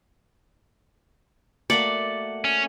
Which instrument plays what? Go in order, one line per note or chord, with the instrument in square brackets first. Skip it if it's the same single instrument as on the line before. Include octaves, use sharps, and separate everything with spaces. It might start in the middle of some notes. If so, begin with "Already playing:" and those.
[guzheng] A3 A#3 F#4 [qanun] D5 [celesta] C#7 F#7
[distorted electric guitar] C#4